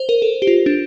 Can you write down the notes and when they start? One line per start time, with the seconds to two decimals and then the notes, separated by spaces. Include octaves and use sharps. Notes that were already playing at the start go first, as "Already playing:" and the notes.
Already playing: C5
0.09 A#4
0.22 A4
0.42 G4
0.47 F4
0.66 D4